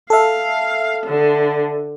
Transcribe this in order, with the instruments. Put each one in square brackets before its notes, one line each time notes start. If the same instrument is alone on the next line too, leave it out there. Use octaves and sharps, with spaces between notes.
[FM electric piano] A4 E5 [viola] F5
[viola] D3